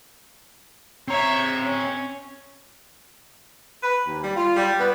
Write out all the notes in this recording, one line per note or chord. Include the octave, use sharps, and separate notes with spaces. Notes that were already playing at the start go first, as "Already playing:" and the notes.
C4 C#5 E5 A#5
C#4
B4
D#2
G3
F4
G3
B3